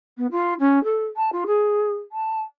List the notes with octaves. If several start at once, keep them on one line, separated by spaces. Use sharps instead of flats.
B3
F4
C#4
A4
A5
F4
G#4
A5